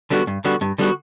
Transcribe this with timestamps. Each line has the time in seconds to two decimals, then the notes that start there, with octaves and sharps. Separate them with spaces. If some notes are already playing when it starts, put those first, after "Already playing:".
0.10 D3 G3 B3 F#4
0.27 G2
0.44 D3 G3 B3 F#4
0.61 G2
0.78 D3 G3 B3 F#4